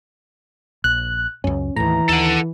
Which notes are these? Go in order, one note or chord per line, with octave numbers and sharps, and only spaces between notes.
A#1 F#6
C#2 F#2 C#4
D#2 A2 E3 A#5
D#2 A4 F#5